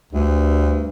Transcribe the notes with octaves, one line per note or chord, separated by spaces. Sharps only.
D2 G2